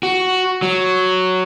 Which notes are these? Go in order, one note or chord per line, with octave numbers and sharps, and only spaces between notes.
F#4
F#3